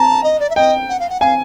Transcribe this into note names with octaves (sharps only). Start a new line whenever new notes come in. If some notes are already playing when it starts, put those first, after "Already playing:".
Already playing: A5 A#5
D#5
D5
E5
D#5 G5
F#5
F5
F#5
F5 G#5